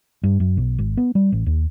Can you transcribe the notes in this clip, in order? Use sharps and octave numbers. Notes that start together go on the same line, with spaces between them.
G2
F#2
B1
G#1
B3
G3
A1
D#2